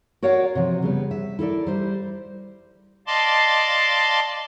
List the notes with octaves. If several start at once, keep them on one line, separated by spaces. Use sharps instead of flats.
F#4 A#4 C#5 D5 F5 F#5
C3 F3
C#3 G3 B3
E5
E4 A4 A#4 D5
G3 C5
D5 D#5 F5 A5 C6 D6